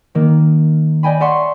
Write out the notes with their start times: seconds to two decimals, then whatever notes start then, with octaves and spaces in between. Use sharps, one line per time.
0.15 D#3 A#3
1.03 D5 D#5 G5 G#5 B5
1.20 D5 E5 F#5 C6 C#6